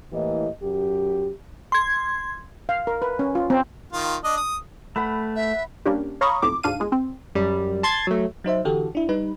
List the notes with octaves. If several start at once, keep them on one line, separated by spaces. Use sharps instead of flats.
A2 E3 A#3 G4 D#5
F#2 G4
C6 G#6
F5
A#4
B4
C#4
F4
C4
D#3 F4
D4 D#5
D#6
A3 B4 F#5 B5
E5
G3 A#3 C#4 D4 G4
C#5 F5 A#5 B5 C#6 D#6
B1 F2 A2 D6
D2 G#2 D4 F5 D#7
G1 G#3
C4
F#2 G3
A5 C6 G#6 A6
F#3 A3
F#3 D#4 C5 E5
D3 E3 F#4 G4 A4
D4 E4
G3 D#4 B4